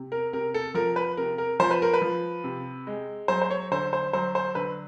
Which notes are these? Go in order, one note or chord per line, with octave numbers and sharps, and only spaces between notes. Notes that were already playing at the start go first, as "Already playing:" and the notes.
Already playing: C3
A#4
C3 A#4
A4
F3 A#4
B4
C3 A#4
A#4
F3 C5
B4
A#4
B4
F3
C3
G#3
F#3 C5
C5
C#5
D3 C5
C5
F#3 C5
C5
D3 B4